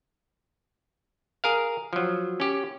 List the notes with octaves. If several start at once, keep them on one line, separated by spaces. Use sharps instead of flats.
G#4 A#4 F5
F3 F#3
C#4 G4